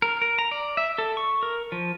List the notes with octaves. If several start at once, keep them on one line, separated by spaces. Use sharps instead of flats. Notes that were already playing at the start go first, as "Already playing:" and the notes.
A#4
A#4
A#5
D5
E5
A4
C#6
A#4
F3